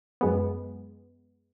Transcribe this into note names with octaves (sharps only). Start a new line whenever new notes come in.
F#2 G#3 B3